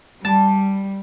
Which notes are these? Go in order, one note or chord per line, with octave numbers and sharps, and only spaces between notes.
G3 A5